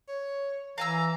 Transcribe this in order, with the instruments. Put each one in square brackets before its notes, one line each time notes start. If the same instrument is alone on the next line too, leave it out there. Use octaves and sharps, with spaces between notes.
[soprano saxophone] C#5
[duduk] E3 [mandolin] F5 G#5 E6 [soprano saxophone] A#5